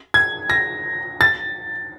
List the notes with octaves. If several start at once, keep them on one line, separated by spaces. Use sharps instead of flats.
G#6
A#6
A6